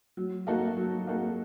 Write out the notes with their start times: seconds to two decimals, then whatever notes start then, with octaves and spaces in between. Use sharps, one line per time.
0.17 F#3
0.47 A#3 D#4 F#4 A4
0.77 F#3
1.07 A#3 D#4 F#4 A4